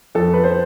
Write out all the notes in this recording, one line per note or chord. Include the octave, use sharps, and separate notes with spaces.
F2 A4
B4
C5